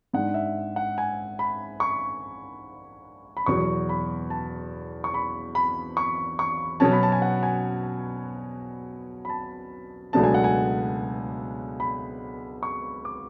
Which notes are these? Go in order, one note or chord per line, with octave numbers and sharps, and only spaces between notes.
G#2 G#3 D4 F#5
E5
F#5
G#5
B5
C#6
B5
E2 B2 F#3 C#6
B5
A5
C#6
B5
B5
C#6
C#6
B2 F#3 C#4 A5
B5
A5
G#5
F#5
G#5
B5
A5
C#2 B2 F#3 A3 D4 A5
G#5
F#5
G#5
B5
C#6
D6